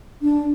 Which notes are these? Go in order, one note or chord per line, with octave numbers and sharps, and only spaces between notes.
D4